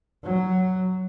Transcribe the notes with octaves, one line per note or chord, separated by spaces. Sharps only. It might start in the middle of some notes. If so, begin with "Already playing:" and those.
F#3